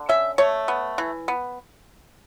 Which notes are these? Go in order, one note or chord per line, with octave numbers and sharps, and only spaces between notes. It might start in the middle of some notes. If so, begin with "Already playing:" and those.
Already playing: D3
C#4 E5
A3 C#5
B3
E3
B3